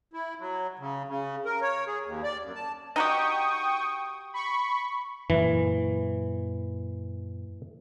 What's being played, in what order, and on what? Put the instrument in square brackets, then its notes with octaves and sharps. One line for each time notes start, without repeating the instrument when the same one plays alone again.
[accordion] E4
F#3
C#3
C#3
A#4
C#5
G#4
D#2
D5
F#2
A5
[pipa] D#4 F#4 G4 [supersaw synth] G5 C#6 D#6
[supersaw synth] B5 C#6
[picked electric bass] F#2 A#2 [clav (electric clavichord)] E3